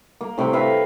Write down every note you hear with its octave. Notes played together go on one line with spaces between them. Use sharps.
A#3
A2 C3 G5 B5
A#4 B4 E5 F5